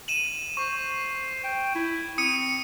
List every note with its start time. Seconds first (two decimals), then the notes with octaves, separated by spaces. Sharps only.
0.08 D#7 E7 F#7
0.57 C5 C#6
1.44 G5
1.75 E4
2.18 C4 D#6 C#7 D#7